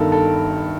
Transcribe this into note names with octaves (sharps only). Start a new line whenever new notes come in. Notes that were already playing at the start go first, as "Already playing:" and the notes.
Already playing: G1 G2 D#3 A4 A#4
A4